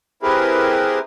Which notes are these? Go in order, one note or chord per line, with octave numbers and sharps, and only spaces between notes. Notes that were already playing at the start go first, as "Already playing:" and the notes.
C4 E4 G4 G#4 A#4 B4